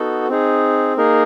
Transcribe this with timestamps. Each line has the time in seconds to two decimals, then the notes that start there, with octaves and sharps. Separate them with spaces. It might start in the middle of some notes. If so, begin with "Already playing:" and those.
Already playing: B3 D#4 F#4 A4
0.28 C4 D#4 G#4
0.97 A#3 D#4 G#4 A#4